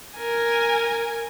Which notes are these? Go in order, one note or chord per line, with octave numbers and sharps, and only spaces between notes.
A#4 G#5